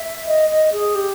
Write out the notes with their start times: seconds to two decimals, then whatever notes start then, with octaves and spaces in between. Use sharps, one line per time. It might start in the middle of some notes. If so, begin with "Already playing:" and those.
Already playing: E5
0.27 D#5
0.49 D#5
0.72 G#4
0.95 G4